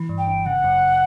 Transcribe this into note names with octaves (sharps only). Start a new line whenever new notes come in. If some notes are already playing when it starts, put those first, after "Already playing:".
Already playing: E3
G2
G5
G1
C#3 F#5
F#2